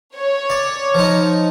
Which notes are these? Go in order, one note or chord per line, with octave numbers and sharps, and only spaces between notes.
C#5
D5
F3 D#4